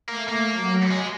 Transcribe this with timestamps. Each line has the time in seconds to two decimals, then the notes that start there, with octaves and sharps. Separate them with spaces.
0.08 A3 A#3
0.29 A#3
0.50 F#3
0.91 G#3